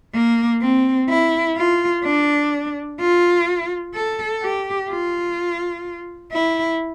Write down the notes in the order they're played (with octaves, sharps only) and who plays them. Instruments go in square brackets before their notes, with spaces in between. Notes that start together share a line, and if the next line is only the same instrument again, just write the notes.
[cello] A#3
C4
E4
F4
D4
F4
A4
G4
F4
E4